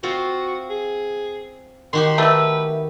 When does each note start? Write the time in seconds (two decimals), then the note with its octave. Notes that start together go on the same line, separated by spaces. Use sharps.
0.03 C4 F4 F#4
0.70 G#4
1.93 D#3 F#4 G4 C6
2.18 A3 B4 E5